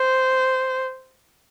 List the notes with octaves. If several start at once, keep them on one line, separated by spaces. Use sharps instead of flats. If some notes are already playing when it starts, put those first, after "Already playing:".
Already playing: C5